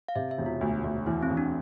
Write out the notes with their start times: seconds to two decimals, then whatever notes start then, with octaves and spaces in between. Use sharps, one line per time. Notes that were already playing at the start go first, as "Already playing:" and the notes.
0.08 F5
0.15 C3 E5
0.31 E5
0.38 E1
0.46 F4
0.61 D2
0.84 D2
1.06 E2 E4
1.23 C4
1.30 E2
1.37 D4